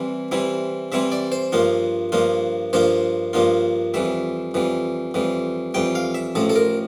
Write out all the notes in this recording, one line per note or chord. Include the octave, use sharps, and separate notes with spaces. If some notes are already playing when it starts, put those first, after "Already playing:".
Already playing: C3 E3 G3 C4 E4
C3 E3 G3 C4 E4
C3 E3 G3 C4 E4 E5
D5
C5
G2 F3 A#3 D4 F4
G2 F3 A#3 D4 F4
G2 F3 A#3 D4 F4 C5
G2 F3 A#3 D4 F4
F2 E3 G3 E5
F2 E3 G3
F2 E3 G3
F2 E3 G3 G5
F5
E5
A1 A2 F3 A4
A4
A#4